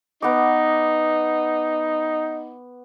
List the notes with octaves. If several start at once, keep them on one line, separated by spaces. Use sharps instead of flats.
B3 D#4 D6